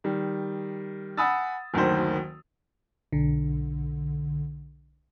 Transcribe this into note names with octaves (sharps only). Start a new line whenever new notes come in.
D#3 G3
F#5 G#5 B5 D#6 E6 A6
F#1 D2 D#3 C5
B1 D3